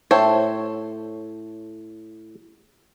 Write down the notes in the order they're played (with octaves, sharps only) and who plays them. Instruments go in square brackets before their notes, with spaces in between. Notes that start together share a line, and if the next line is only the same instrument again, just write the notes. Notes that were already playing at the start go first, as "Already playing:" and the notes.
[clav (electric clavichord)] A2 [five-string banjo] A4 C5 C#5